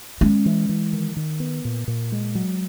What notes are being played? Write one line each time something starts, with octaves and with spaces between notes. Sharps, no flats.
G#3 C#4
E3
E3
D#3
D#3
B3
A#2
A#2
G#3
F#3